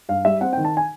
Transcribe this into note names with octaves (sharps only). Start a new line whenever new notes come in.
G2 F5
G3 E5
C4 F#5
G5
D#3
A5
G#5